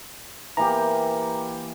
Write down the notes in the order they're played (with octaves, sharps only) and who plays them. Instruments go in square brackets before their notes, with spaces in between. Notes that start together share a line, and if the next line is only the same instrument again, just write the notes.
[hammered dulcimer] E3 A#3 G4 [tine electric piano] A#5